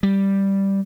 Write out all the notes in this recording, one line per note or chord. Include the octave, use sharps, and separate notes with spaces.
G3